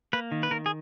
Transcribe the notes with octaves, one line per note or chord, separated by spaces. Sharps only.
A#3 B4
D#3
B4
D#3 A#4
G#4